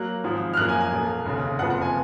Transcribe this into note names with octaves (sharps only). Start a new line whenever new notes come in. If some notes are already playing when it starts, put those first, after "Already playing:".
Already playing: F#3 A#3 F#6
G#1 G#2 F3
F6
F#2 F3 A#3 F#6
G#5
G#5
B1 B2 A#3
F1 D#2 C#3
F#1 F2 F3 B3 F#5
F#5
G#5